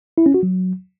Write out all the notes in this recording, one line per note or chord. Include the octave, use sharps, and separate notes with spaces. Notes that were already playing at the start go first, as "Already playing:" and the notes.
E4
C#4
F#4
F#3